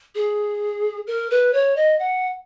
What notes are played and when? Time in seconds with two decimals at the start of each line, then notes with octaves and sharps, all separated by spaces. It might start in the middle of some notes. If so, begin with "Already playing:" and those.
0.15 G#4
1.07 A#4
1.31 B4
1.53 C#5
1.76 D#5
1.99 F#5